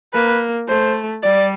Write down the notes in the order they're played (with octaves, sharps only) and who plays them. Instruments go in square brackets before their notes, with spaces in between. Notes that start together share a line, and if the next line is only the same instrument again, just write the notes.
[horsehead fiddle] A#3 [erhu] B4
[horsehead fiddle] A3 [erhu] C5
[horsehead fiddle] G3 [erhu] D5